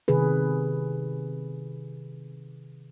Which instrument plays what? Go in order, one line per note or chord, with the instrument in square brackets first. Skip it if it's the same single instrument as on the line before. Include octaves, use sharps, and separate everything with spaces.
[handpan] C3 D#3 G#4 B4